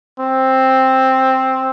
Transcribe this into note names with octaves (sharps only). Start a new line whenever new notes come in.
C4